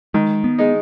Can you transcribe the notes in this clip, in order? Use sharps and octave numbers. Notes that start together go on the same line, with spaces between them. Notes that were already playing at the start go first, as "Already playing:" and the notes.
D#3 G#3
B3
G#3 D#4